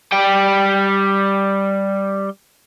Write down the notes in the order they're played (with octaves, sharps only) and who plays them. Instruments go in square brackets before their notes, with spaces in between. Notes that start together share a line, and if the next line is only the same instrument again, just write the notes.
[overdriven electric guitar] G3 G5